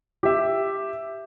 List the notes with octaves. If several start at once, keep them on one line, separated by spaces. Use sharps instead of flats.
G4 E5